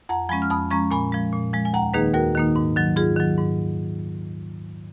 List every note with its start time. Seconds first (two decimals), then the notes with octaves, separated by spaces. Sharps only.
0.09 F2 F#5 A#5
0.29 F3 G#3 C#4 G#5 B5
0.42 F6
0.50 F2 B5 D#6
0.71 F3 G#3 C#4 A#5 C#6
0.91 A#2 G#5 B5
1.12 F3 G#3
1.33 A#2
1.53 F3 G#3
1.65 G#5
1.74 D#2 F#5 A#5
1.94 D#3 A#3 D#4 G#4 B4
2.14 D#2 F#4 A#4
2.35 D#3 A#3 D#4
2.56 G#2
2.76 D#3 F#3
2.96 G#2 F4 G#4
3.17 D#3 F#3
3.37 G#2